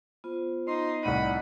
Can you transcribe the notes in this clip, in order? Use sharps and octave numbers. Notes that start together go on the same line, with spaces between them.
B3 F4 C5
D#4 C6
C2 A2 D#4 D5 D#5 F#5 B5 D#7